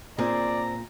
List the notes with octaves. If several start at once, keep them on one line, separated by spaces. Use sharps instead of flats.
A#2 C4 D4 G#4 A#4 D5 A#5